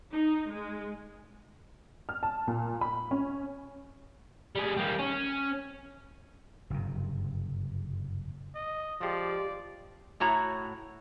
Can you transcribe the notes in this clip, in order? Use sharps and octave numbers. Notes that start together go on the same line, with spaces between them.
D#4
G#3
F6
A5
A#2
B5
C#4
G3 G#4
G3 A#3
C#4
F#1 G2 C3
D#5
F3 G#3 G4 D5
A2 F#4 C#5 A#5